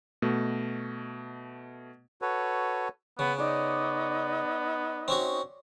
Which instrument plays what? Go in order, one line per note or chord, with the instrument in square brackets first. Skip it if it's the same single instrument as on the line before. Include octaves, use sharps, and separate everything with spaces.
[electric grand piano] B2 A3
[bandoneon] F#4 A4 B4 C#5
[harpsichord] C#3 [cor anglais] B3
[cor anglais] B3 [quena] D#4 [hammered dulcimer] C#5 D5
[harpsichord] C4 C#4 F#4